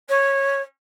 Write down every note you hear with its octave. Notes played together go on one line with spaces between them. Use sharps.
C#5